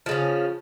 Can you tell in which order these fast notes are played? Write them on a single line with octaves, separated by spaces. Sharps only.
F3 C#3 C#4